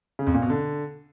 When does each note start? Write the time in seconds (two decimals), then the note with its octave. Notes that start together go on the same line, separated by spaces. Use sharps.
0.19 C#3
0.27 F2
0.34 A#2
0.42 B2
0.50 D3